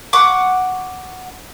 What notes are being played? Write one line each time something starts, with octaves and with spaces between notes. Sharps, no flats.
F#5 C#6 D6